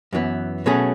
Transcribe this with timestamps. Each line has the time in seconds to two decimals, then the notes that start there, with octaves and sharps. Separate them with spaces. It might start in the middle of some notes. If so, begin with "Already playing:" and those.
0.13 F#2 E3 B3
0.66 B2 F#3 A3 C#4 G#4